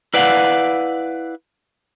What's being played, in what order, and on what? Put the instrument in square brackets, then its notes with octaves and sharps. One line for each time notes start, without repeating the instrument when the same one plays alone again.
[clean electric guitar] E4 B4 D5 F5 F#5